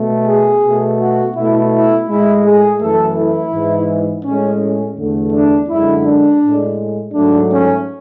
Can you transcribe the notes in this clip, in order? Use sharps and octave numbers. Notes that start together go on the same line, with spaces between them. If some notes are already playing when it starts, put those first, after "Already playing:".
Already playing: B2 A3
G#4
B2 A3
F#4
B2 A3 E4
E4
A2 G#3 E4
G#4
F#2 E3 A3 A4
E4
G#2 E3 G#3
A2 G#3 C#4
C#4
E2 D3 A3
D4
F#2 D3 G#3 E4
D4
A2 G#3
G#2 F#3 A3 D4
C#4